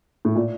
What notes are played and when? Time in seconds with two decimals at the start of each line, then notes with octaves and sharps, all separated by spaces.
0.25 A2
0.35 A#2